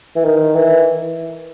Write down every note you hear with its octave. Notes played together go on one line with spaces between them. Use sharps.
E3
D#3
E3